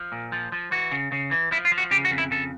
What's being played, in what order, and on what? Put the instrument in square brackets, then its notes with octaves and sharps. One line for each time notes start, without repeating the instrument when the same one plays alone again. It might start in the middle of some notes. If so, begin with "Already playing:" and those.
Already playing: [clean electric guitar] F3
A#2
F3
F3
E3 F#4
C#3
C#3
E3
F3 E4
F4
F3
F#4
C#3 G4
F#4
F2
E4
C#3 A4